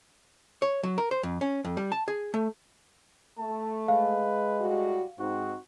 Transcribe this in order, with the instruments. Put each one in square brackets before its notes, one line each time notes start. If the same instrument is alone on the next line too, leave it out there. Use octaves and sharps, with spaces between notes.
[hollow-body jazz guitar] C#5
F#3
A#4
C5
F2
C#4
F2
G3
A5
G#4
A3
[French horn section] A3 [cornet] A5
[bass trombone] G#3 [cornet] B4 [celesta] F5
[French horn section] A2 G3 F#4
[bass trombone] G#2 [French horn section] C4 D#4 [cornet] F#4